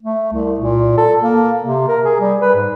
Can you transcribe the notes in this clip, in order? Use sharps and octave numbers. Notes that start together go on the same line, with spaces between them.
A3
C2
A#2
A4
A#3
C3
A#4
G#4
G3
B4
G#2